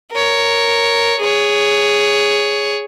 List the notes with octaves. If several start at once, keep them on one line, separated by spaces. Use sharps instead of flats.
A#4 C#5
G#4 C#5